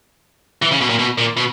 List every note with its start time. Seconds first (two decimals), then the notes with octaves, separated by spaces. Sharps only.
0.62 E3
0.71 C#3
0.81 B2
0.89 A#2
0.99 B2
1.18 A#2
1.37 B2